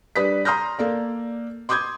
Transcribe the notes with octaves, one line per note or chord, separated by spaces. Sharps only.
G3 D4 B4 D#6 B6
A#5 C6 D#6 F6 G6 A#6
A#3 A4 D5
C6 D6 D#6 G6 G#6